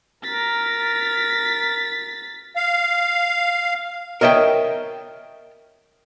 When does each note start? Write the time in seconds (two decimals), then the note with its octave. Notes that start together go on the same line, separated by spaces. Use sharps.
0.23 A#4 A6 B6
2.56 F5
4.21 A#4 C#5 D#5 E5 G5